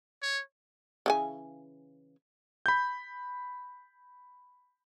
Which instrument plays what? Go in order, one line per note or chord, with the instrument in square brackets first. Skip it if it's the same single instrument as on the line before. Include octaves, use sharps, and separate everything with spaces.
[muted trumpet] C#5
[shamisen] C#3 E3 G#5
[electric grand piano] B5 G6